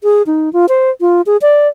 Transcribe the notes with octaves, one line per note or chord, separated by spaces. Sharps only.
G#4
D#4
F4
C5
F4
G#4
D5